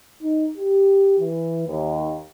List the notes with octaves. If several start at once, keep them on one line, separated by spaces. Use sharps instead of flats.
D#4
G4
E3
D#2